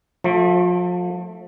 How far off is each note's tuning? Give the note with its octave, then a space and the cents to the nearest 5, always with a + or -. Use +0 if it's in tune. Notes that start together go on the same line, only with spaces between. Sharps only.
F3 +35 A3 +0